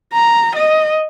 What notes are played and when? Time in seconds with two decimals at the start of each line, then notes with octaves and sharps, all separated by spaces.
0.14 A#5
0.56 D#5